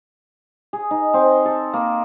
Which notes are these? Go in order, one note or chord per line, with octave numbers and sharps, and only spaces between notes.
G#4
D#4
C4
A4
A#3